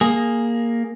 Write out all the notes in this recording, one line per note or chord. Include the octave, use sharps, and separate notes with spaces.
A#3 G#4